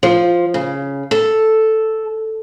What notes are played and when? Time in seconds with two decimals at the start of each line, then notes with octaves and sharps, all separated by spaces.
0.03 F3
0.54 C#3
1.11 A4